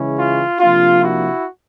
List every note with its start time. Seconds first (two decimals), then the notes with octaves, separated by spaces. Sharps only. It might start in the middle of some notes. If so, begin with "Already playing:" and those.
Already playing: C#3 E3 G#3 C#4 E4
0.18 F4
0.60 C3 F3 A#3 D4 F4
1.03 E4 F#4